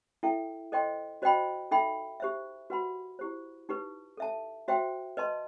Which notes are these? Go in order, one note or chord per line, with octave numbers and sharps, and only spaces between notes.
E4 A4 E5 G5
A4 C5 D#5 G5 C6
F#4 C5 D#5 G5 B5
D#4 A4 E5 G5 B5
G4 C5 E5
F#4 B4 F#5 B5
E4 G4 C5
D#4 G4 B4
A4 E5 A5
F#4 C5 E5 G5 C6
B4 D#5 A5 C6